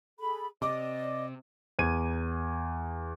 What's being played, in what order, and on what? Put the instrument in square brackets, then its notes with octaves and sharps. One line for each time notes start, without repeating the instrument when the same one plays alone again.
[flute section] G#4 A4 B5
[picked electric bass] C3 [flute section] D5 [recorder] D#5 [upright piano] D6
[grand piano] E2 G#6 D#7